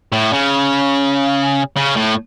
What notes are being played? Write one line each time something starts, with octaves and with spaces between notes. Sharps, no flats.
A2
C#3
C#3
A2